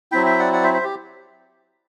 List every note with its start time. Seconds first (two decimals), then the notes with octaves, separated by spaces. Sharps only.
0.12 F#3 C4 E4 E5 G5
0.26 E5 G5
0.39 D5 F#5
0.53 D5 F#5
0.63 C5 E5
0.74 C5 E5
0.84 G4